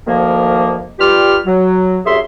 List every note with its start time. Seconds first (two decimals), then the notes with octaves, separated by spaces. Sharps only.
0.06 D2 D#3 F3 A#3
0.99 G2 G3 F4 G4 F6
1.47 F#3
2.06 C2 F#2 G#4 E5 C6